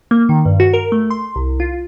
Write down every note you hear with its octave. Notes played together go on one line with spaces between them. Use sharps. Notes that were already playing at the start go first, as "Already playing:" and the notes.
A#3
D#3
G2
F#4
A#4
A3
C6
C2
F4